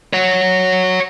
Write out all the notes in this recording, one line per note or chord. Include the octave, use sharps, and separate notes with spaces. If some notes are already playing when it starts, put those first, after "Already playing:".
C#5 F#5